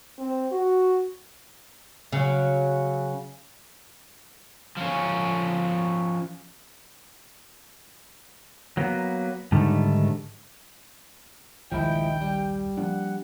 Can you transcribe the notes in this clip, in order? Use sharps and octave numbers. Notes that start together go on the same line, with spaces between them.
C4
F#4
C#3 F#3
F3 C#4
F#3 A#3 B3
G#2 D3 D#3 G3 A3
A#1 D#2 D#3 F3 G#3 E4 G5
G3
F3 A#3 D4 F#5